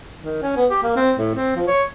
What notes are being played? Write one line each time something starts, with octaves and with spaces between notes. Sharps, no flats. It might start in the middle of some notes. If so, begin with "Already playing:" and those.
D#3
C#4
B3
G4
A#3
C4
A2
C4
F3
C#5